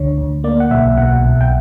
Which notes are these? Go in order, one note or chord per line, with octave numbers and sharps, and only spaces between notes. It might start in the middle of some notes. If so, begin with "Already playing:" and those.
Already playing: D2 D3 C#5
D2
A#3 D5
F#5
B1 E5
B2 F#5
B1
G5